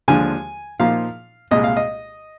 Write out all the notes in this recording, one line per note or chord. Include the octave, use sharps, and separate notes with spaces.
D#2 D3 F3 G#3 D4 G#5
A#2 F3 A#3 D#4 F5
C2 A#2 G#3 D#5
F5
D#5